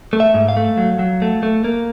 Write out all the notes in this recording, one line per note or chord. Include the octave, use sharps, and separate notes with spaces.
A3
E5
G#2
F5
A3
F#3
F#3
A3
A3
A#3